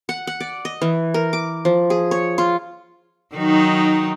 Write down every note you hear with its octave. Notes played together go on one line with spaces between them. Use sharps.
F#5
F#5
D5
D#5
E3
A#4
D6
F3
G#4
C#5
F4
D#3 F#3 D#4